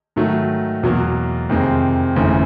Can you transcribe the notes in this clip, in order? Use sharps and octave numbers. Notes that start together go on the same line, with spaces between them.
G#2 D#3 F#3 A3
E2 B2 F#3 A#3
F2 C3 D#3 G#3 C4
G1 F2 C#3 E3 A3